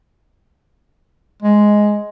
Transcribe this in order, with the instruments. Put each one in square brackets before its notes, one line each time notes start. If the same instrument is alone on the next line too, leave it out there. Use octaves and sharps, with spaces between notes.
[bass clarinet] G#3